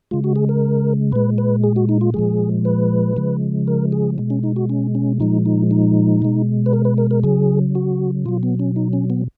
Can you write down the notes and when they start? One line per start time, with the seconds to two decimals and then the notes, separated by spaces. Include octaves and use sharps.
0.11 C#3 G#3 F4
0.24 F#4
0.36 G#4
0.49 A#4
1.12 A#2 G#3 B4
1.38 B4
1.64 G#4
1.76 F#4
1.89 D#4
2.01 F4
2.14 A#2 F3 G#3 G#4
2.65 B4
3.16 C#3 F3 G#3
3.68 A#4
3.92 G#4
4.18 B2 G#3
4.30 C#4
4.43 D#4
4.56 F#4
4.69 C#4
4.95 C#4
5.20 A#2 F3 G#3 D#4
5.46 D#4
5.71 D#4
6.22 B2 G#3
6.66 B4
6.73 A#4
6.85 B4
6.98 A#4
7.11 A#4
7.24 C#3 F#3 G#4
7.75 F#4
8.25 B2 F#3 F4
8.43 B3
8.60 C#4
8.76 D#4
8.93 C#4
9.10 B3